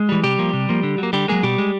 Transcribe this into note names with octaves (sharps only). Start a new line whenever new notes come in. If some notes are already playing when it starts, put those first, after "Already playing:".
Already playing: G#3
E3 G3
C3 G3 G4
F3 A#3
C3
F3 A#3
D3
F#3 A#3
D3 G3 G4
F#3 G#3 A#3 G#4
B2 G3 G4
G#3